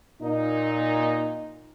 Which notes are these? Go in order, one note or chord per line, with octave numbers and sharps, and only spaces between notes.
A#2 D#4